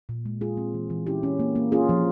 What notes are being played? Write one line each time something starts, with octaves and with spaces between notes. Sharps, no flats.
A#2
G#3
G#3 F4 G#4
C4
E3
E3
C#4 E4 G4
C#4
A#3
A#3
C#4 F4 G#4
F3